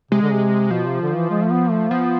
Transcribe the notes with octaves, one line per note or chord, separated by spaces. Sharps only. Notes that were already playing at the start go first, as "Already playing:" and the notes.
C3 G#3
D3
C3
B2 F3
C3
D3
E3
G#3
A3
B3
A3
F3 B3